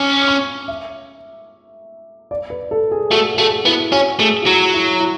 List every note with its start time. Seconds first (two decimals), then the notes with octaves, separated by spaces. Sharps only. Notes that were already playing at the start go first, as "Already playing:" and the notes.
Already playing: C#4 D6
0.21 D6
0.28 C#6
0.68 E5
2.31 D5
2.50 B4
2.71 A4
2.91 G#4
3.11 A3 F#4
3.34 G#4
3.38 A3 F#4
3.65 B3 E4
3.92 C#4 F#4
4.19 A3 G#4
4.42 F#4
4.46 F#3 E4
4.74 E4
5.00 E4